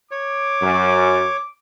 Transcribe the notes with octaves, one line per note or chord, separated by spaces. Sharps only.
C#5 D6
F#2